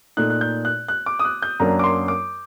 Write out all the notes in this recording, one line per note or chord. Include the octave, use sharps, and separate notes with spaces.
A#2 A3 D#4 F#6
F#6
G6
F#6
F#6
D6
D#6
F#6
G6
F#2 F#3 A#3 D4 A#5
D6
C6
D6